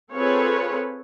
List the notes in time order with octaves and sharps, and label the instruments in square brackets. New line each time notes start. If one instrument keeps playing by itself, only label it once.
[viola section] C4 F4 G#4 A4 B4 C#5